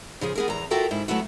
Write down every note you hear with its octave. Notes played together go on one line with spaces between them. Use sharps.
C#3 F3 G#4
B3 G#4 A#4
E2 A#5
F4 F#4 A4 A#4 E5 G5
G#2 E4
F#3 G3 A3 B3 E4 F#4